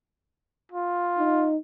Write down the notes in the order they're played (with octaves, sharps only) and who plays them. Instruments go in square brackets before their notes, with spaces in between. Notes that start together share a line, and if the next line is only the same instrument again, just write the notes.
[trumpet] F4
[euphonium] D#4